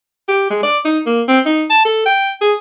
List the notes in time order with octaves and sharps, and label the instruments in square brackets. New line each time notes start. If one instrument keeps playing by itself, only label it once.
[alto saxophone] G4
G#3
D5
D#4
A#3
C4
D#4
A5
A4
G5
G#4